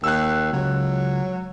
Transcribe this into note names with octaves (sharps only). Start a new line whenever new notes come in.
D#2 E6 F#6
C#2 F#3